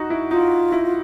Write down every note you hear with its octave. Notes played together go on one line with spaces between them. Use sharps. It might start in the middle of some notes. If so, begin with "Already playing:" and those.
Already playing: D#4 F#4
E4
D#4 F4
E4